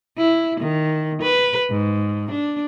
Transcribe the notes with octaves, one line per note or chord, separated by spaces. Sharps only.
E4
D#3
B4
G#2
D4